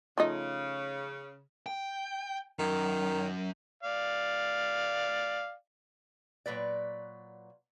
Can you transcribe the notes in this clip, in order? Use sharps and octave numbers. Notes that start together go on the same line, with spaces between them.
C#3 F3 A3 D#4
G5
F#2 D#3
D5 F5
A#2 F#3 B4 D5